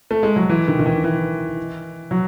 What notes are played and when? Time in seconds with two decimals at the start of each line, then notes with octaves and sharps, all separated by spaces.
0.11 A3
0.23 G#3
0.36 F#3
0.49 E3
0.68 D#3
0.79 D#3
0.86 E3
1.04 E3
2.11 F#3